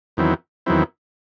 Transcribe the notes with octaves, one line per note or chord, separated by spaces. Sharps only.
E2 D#3 F#3 C4 E4
E2 D#3 F#3 C4 E4